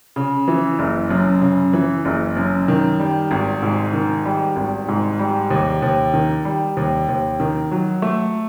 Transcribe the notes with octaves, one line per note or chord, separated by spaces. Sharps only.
C#3
E3
F#1
F#2
C#3
E3
F#1
F#2
D#3
G3
G#1
G#2
D#3
G3
G#1
G#2
G3
D#2
D#2
D#3
G3
D#2
D#2
D#3
F#3
A3